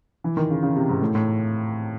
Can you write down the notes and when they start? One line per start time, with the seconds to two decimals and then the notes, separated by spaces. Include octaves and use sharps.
0.24 E3
0.37 D#3
0.50 C#3
0.63 C#3
0.76 C3
0.89 G#2
1.02 A2
1.15 A2